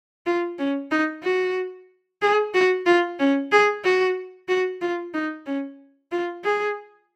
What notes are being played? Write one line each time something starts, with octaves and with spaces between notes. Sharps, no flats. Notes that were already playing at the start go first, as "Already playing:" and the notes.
F4
C#4
D#4
F#4
G#4
F#4
F4
C#4
G#4
F#4
F#4
F4
D#4
C#4
F4
G#4